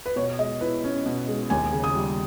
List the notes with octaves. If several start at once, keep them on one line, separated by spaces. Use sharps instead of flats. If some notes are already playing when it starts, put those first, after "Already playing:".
B4
B2 C#5
G#3 D#5
E4 B4
C#4
B2
G#3
D#2 G#5
C#3
D#6
G3